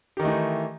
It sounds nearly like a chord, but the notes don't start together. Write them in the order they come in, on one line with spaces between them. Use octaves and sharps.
G4 D#3 D#4 A3 E3